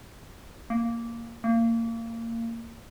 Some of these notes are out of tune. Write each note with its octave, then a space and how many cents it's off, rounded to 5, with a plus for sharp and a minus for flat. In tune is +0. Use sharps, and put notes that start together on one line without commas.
A#3 -5
A#3 -25